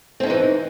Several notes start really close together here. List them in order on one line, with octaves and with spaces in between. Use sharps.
C4 C#4 D#4 E3